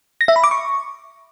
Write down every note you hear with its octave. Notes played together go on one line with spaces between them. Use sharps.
A#6
E5
B5
D6
C#6